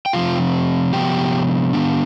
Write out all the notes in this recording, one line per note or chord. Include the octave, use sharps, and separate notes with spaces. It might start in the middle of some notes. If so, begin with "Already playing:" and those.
G5
C3 F3 C4 F4 F5
C3 F3 B3 G4 G5
D#3 B3 D4